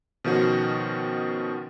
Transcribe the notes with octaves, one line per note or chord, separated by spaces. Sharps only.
B2 D#3 F3 C#4 F#4